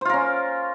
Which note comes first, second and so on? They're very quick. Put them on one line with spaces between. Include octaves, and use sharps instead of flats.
C5 F4 A#4 C#4